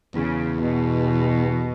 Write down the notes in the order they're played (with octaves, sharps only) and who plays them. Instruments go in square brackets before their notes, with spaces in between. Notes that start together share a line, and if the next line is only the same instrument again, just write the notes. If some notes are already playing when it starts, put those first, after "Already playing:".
[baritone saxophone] E2 [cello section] C#3
[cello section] B2